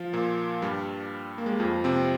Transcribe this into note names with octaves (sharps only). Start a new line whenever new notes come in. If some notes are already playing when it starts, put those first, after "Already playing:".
Already playing: F3 F4
A#2 A#3
G2 G3
A#3
G#3
G3
F2 F3
C3 C4